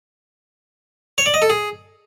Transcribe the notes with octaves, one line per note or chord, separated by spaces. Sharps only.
C#5
D5
D#5
A4
G#4